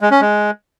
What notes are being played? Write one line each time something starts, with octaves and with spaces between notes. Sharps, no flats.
G#3
C#4
G#3